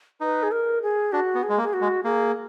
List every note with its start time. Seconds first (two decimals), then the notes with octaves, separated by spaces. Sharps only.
0.21 D#4 B4
0.43 G#4
0.52 A#4
0.82 G#4
1.12 D4 F#4
1.35 B3
1.43 G#4
1.49 G#3
1.58 A#3
1.63 G#4
1.73 F#4
1.81 G#3
2.04 A#3 G#4